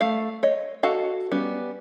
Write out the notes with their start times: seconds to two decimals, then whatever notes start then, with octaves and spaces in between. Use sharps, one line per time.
0.01 A3 F5
0.43 C#5 D#5
0.83 F#4 A4 D#5 F5
1.32 G3 B3 C#4